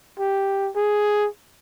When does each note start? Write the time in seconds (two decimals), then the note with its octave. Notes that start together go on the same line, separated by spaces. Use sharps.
0.19 G4
0.76 G#4